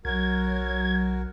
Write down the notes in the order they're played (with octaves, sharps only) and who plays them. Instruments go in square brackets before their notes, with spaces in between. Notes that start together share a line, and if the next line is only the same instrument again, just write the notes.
[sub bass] B1 [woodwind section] F#3 [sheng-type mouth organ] F#4 A#4 [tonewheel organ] G#6